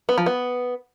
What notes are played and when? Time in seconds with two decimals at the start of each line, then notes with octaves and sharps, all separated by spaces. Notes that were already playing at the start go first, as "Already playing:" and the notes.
0.09 B3
0.18 F3
0.26 B3